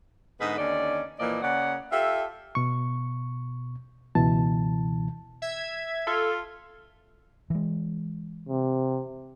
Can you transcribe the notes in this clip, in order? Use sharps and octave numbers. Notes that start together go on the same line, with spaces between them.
G#2 D3 B3 D#4 G#4 B4
D#2 D3 C#4 D#4 D5
A#2 E3 F3 A#3 D5 D#5
C#3 A#3 C#5 D5 F#5
F4 G4 A4 E5
B2 C#6
C#2 B2 E3 A5
E5 G#6
F4 A4
E3 G#3
C3